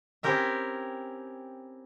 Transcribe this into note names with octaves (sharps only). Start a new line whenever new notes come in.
C4 C#4 E4 G4 A#4 E5